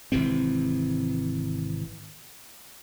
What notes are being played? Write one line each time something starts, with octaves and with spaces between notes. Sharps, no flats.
G#1 C3 E3 C4